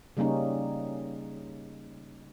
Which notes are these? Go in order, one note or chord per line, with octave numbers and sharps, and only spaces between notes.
C#3 G3 A#3 C#4 D#4